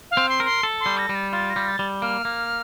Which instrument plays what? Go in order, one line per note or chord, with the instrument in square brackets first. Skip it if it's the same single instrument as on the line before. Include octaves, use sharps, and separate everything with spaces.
[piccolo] F5
[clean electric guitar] C4
[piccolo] C6
[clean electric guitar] A#4
[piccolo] C6
[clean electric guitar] A4
[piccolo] C6
[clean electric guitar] G3
[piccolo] A#6
[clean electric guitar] G3
[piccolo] A6
[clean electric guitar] F4 [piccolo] A6
[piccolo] A#6
[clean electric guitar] G3
[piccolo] A6
[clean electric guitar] G3
[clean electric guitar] A#3 [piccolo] F6
[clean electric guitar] A#3